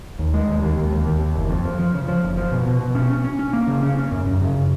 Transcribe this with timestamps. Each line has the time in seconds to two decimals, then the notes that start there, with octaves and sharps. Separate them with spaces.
0.19 D#2
0.34 G#3
0.48 D#2
0.62 D#2
0.77 D#2
0.91 D#2
1.06 D#2
1.20 D#2
1.35 F#1
1.50 F2
1.65 F3
1.79 F3
1.94 C#3
2.08 F3
2.23 F#1
2.37 F3
2.52 B2
2.66 B2
2.80 B2
2.95 C#4
3.10 C#4
3.24 C#4
3.39 C#4
3.53 A#3
3.68 C#3
3.83 C#4
3.97 C#4
4.12 F#2
4.26 F#2
4.41 C#3